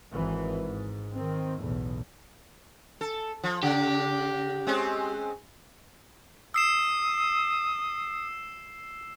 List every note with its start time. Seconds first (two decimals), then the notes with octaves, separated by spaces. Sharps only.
0.11 G#1 E3
0.59 G#2
1.14 D#3 C4
1.62 B1 E2 A2
3.01 A4
3.43 F3
3.63 C#3 G4
4.67 G#3 C4 C#4
6.54 D#6 E6 C7 E7